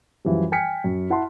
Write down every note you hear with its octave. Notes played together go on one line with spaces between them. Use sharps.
F#2 E3 F3 G3
G5 G#5 F6 B6 C#7
F#2
E4 F#5 A5 C6